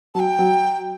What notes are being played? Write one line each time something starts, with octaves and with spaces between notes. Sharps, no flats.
F#3 G5 A5
F#3